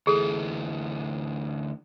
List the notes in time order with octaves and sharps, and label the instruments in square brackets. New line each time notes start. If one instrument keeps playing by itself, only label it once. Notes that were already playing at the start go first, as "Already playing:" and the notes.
[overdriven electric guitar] D2 E3 [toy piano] G#4 A4